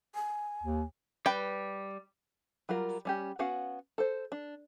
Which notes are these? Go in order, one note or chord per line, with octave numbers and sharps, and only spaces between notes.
G#5
D#2
G3 B4 G5
F#3 G3 F4 A#4
G3 C#4 G4
B3 C#4 F#4 F5 F#5
A4 C5
D4